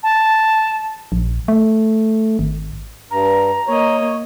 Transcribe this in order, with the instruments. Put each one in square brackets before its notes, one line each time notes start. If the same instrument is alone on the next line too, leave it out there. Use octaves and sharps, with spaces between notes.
[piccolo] A5
[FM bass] A#1
A3
G#1
[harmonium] G2 [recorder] A#5
[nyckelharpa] A#3 D#5 [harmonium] C#5